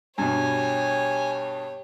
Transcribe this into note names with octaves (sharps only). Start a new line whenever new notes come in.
G2 B2 G4 C#5 G#5